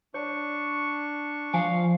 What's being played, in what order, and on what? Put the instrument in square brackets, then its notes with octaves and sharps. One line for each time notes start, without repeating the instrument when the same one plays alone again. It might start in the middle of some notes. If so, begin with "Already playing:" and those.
[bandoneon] D4 C#6 [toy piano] C#5
[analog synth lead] F3 [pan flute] F5 [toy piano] G#5